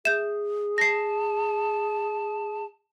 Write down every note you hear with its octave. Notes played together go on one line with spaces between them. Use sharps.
G#4 E5 G6 E7
A5 A#6 C7